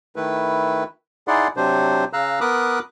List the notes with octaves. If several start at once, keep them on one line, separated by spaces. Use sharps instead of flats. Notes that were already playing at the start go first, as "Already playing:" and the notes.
D#3 A3 E4 B4
D#4 E4 G#4 D5 F#5 C6
C3 F#3 D4 C5
C#3 F5 A#5 E6 F#6
B3 A#4 B5 D6 D#6 F#6